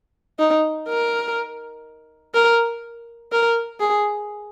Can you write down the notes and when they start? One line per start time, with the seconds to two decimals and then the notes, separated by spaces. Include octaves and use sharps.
0.39 D#4
0.88 A#4
2.34 A#4
3.32 A#4
3.80 G#4